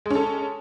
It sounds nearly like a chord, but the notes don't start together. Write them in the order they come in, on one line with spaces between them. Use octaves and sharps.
G#3 C#4 A4